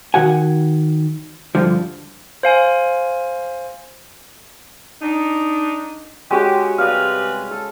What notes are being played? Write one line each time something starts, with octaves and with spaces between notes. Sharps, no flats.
D#3 F#4 F#5 G#5
G2 D3 F3
C5 F5 G#5
D4 D#4
G#3 C#4 F#4 G4
C3 G3 B4 F5 D#6
A4